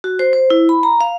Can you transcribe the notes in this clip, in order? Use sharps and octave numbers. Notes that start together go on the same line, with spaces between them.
F#4
C5
C5
E4
B5
A#5
F5